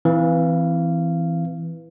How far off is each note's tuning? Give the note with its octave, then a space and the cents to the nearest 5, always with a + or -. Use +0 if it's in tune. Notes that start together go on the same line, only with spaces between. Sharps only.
E3 +0 C4 -20 F5 -20